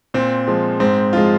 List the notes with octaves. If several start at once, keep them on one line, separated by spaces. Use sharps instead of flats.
A#2 C4
F3 G#3
G#2 C4
F3 G#3 F4